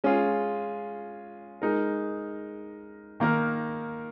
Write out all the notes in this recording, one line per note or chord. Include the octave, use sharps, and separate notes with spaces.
G#3 C#4 F4 G#4
G#3 D#4 A#4
D#3 A#3 D#4 A#4